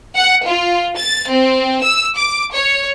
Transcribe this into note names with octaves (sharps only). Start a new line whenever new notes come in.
F#5
F4
A6
C4
E6
D6
C#5